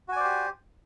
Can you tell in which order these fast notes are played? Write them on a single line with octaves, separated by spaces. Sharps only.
F#4 G#5 D5 C5 G4